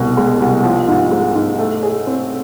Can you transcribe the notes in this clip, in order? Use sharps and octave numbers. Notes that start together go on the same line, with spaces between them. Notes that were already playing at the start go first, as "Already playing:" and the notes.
Already playing: C2 B2
G#3
C2
F3
G#2
G#3
G#2
A3
G#4
C4